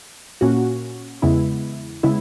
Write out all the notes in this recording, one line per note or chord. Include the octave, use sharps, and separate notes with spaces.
A#2 A#3 C#4 F#4
E2 C#3 G#3 B3 E4
C#3 G#3 B3 E4